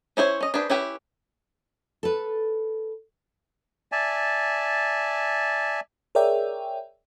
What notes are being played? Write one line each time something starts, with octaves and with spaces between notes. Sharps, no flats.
C#4 E4 C5 C#5
C#4 D#5
D4 G#4 B4 C5
C#4 E4 G4 B4
A4 B4
D5 E5 G#5 A5
G#4 A#4 C#5 D5 E5 G5